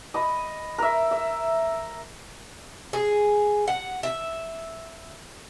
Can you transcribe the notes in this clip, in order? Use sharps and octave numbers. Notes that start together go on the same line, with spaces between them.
D#5 B5
A#4 E5
E5
G#4
F#5
E5